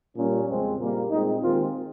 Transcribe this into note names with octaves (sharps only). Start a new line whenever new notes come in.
A#2 G3 A#3 C#4
F2 C#3 G#3 C4
A#2 G3 A#3
A#2 G#3 C4 D#4
D#2 D#3 G#3 C4 F4